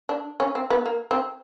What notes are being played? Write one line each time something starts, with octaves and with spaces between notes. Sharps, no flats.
D4
C#4
C4
B3
A#3
C4